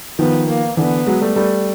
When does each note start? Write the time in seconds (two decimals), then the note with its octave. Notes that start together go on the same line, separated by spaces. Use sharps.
0.19 D#3 F3 B3
0.48 A#3
0.77 D3 E3 B3
1.07 F#3 G#3
1.21 G3 A3
1.36 G3 A3